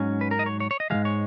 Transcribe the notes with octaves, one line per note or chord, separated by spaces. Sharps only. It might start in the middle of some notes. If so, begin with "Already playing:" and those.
Already playing: G#2 F#3 C#4
B4
A#4
D#5
C#5
C#5
C#5
D#5
G#2 F3 G#3 F5
C#5